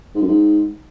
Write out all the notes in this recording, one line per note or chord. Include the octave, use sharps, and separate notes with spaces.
G#2
F#2
G#2